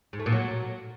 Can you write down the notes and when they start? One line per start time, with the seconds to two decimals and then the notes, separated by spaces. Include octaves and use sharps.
0.13 G#2
0.20 A3
0.26 A#2
0.32 F#3